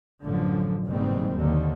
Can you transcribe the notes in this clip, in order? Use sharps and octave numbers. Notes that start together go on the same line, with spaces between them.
A1 F#2 D3 F3
F#1 G#2 B2 D#3 G3 C4
D#2 D3